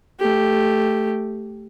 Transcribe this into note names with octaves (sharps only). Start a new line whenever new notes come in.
A3 G4